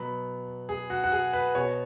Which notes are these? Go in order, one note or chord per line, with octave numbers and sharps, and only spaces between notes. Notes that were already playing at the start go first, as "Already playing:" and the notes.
Already playing: B2 F#3 B3 B5
G#4
F#4
F#4
G#4
B4
B2 B3 C#5